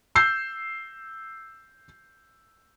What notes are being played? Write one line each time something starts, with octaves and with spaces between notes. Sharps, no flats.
E6 G6 C7